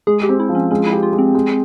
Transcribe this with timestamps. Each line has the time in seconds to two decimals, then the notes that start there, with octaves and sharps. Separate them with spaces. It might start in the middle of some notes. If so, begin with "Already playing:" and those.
0.07 G#3 G#4
0.23 G4
0.29 C4
0.40 E4
0.49 F3
0.55 C#4
0.71 G#3 C#4
0.86 E4
0.93 G4
1.03 F4
1.13 G#3
1.19 C4
1.35 G#3